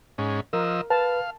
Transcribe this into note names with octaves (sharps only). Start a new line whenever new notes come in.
G#2 C#4
F3 A#4 D#5 E6
B4 F5 A5